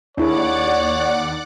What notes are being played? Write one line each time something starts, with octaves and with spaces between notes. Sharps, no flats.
D#2 D4 E4 G#4 C#5 D5 F#5 D6